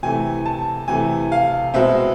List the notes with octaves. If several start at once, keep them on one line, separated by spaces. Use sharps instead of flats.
C3 E3 A3 G#5
A5
C3 E3 A3 G#5
F5
B2 G#3 C4 E5